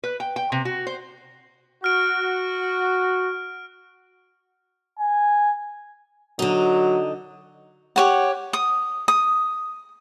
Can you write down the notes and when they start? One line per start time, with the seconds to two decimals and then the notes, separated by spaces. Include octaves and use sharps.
0.04 B4
0.20 G5
0.36 G5
0.52 C3
0.65 F#4
0.87 C5
1.84 F#4 F6 D7
4.99 G#5
6.39 D3 F#3 D#4
7.96 G4 C#5 F#5
8.53 D#6
9.08 D#6